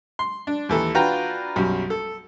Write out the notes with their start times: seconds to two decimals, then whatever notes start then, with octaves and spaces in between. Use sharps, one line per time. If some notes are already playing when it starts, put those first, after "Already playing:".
0.19 C6
0.47 D4
0.69 D#2 E3 A4
0.94 D4 F4 F#4 B4 G5 A#5
1.56 B1 F#2 G3
1.90 A4